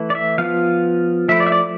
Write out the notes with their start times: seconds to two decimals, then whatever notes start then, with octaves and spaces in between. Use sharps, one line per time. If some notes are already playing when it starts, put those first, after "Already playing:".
Already playing: E3 A3 E4
0.10 D5
0.15 E5
0.38 F3 B3 F4 F5
1.29 F3 A3 E4 E5
1.40 D5
1.46 E5
1.52 D5